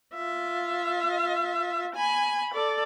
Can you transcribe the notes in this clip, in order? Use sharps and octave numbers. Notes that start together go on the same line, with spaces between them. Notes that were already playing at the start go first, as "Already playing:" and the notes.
F4 E5
G#5 B5
A4 D5